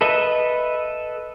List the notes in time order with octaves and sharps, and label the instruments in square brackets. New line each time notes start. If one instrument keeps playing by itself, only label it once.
[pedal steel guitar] A4 B4 D#5 E5